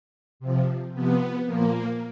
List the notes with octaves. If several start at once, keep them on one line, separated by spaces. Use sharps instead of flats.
C3 F3
C3 F3 B3
A#2 F3 A#3